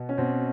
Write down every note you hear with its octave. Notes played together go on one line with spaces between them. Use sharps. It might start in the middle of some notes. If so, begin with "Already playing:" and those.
Already playing: B2 B3
C#4
B2 C4